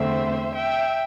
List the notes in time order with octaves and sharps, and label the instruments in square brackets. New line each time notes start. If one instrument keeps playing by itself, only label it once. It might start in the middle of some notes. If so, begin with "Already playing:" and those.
Already playing: [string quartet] E2 D3 A3 C4 C5 E5
E5 G5